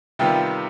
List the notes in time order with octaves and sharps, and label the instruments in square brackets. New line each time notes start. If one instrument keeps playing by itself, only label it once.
[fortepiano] C3 D#3 G3 B3 F4 G4